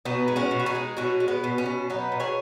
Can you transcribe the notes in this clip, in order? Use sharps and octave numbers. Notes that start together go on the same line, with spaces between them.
B2 B3 D#4
G#3
C#4 F#4
B2
F#4
D#4 G#4
G#3
B2 C#4 F#4
G#3
B3
B2
C#4
B2
F#3 B3 D#4
B2
G#4 C#5